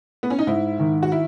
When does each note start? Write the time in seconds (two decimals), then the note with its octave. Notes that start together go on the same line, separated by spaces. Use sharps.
0.23 B3
0.30 C#4
0.39 D#4
0.47 G#2 E4
0.79 D#3
1.03 F#4
1.12 E4